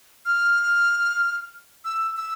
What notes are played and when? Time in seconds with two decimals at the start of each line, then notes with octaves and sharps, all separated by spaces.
0.26 F6
1.85 E6
2.17 E6